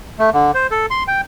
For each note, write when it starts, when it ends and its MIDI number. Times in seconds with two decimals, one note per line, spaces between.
0.19 0.30 57
0.33 0.51 50
0.54 0.67 72
0.71 0.86 69
0.90 1.03 84
1.08 1.21 79